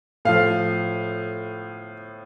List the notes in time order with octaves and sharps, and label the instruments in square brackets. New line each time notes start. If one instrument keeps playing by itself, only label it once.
[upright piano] A2 F3 F5